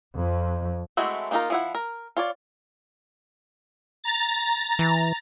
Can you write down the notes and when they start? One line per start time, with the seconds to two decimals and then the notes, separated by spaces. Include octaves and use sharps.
0.15 F2
0.97 G#3 A3 C4 E4 F#4
1.31 A#3 D4 D#4 F4 A#4
1.50 F3 E4 F#5
1.75 A#4
2.17 F4 C#5 D5
4.04 A#5 A6
4.79 E3